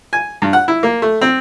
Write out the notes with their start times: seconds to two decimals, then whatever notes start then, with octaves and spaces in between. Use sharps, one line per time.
0.13 G#5
0.42 G2
0.53 F#5
0.68 E4
0.83 A#3
1.02 A3
1.21 C4